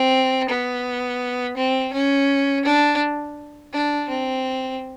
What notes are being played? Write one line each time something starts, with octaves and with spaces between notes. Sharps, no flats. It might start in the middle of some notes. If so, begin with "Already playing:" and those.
Already playing: C4
B3
C4
C#4
D4
D4
C4